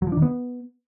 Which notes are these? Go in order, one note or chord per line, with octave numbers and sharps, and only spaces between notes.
F#3
F3
D4
D#3
B3